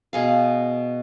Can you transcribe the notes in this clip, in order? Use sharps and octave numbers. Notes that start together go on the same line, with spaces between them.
B2 G#4 F5